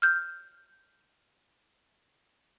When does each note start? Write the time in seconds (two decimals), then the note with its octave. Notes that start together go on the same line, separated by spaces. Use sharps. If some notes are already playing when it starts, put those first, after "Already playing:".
0.02 F6 G6